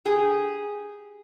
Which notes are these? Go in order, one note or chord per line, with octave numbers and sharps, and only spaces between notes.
G4 G#4